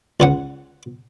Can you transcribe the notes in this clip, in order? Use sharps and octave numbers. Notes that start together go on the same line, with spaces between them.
C#2 C#3 F#5